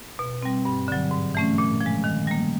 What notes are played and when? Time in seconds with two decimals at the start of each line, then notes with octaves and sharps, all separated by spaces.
0.19 B2
0.43 G3 C4
0.65 G2
0.88 D3 F#3
1.11 G#2
1.35 E3 A3 C#4
1.58 A#2
1.81 F3
1.86 G#3
2.04 D#3
2.27 G3 A#3